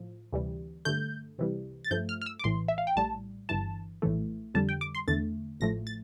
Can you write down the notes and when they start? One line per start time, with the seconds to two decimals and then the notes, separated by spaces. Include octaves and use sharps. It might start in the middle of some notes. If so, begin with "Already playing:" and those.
Already playing: A2 F3
0.33 D2 C3 E3 G3
0.85 G2 D3 A3 G6
1.38 C2 C3 E3 G3
1.85 A6
1.91 G2 F3 A3 G6
2.09 F6
2.22 F6
2.26 E6
2.39 D6
2.44 A#1 A2 E3 C6
2.68 E5
2.78 F5
2.87 G5
2.96 A#1 A2 G3 A5
3.49 G1 G2 E3 A5
4.02 A#1 A2 E3 A3
4.54 F2 D3 G3 A5
4.69 G5
4.81 D6
4.95 C6
5.07 E2 D3 A3 A6
5.60 A1 A2 F3 A3 A#6
5.87 A6